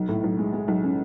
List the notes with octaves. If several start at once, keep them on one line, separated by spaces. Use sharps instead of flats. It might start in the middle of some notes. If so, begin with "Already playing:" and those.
Already playing: B1
A2
B1
G#3
G#3
B1
C#4